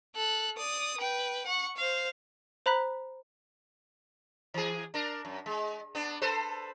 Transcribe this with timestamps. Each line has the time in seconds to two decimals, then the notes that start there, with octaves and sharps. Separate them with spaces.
0.15 A4 F#6
0.57 D5 D#6
0.98 B4 G5
1.46 F#5 C#6
1.77 C5 F5
2.66 C5 A#5 B5 F#6 B6
4.54 E3 G#4
4.94 D4 A#4
5.25 F#2
5.46 G#3
5.95 B3 D4
6.22 A4 B4 C5